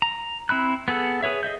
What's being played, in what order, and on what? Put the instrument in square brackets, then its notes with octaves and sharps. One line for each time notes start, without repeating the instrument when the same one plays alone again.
[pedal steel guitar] A#5
C4 E4 B5 F#6
B3 G#4 A4 F#5
G#4 B4 C#5 E5
G#4 D#5 E5 G6